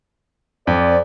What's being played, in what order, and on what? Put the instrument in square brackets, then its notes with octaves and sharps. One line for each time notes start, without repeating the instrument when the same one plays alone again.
[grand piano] F2 [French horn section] C5 D5